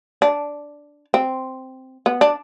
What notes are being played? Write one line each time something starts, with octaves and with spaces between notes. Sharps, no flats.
D4
C4
B3
D4